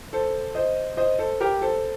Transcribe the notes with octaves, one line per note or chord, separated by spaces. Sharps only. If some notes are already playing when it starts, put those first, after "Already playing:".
A4 C5
C5 D#5
C5 D#5
A4 C5
G4 A#4
A4 C5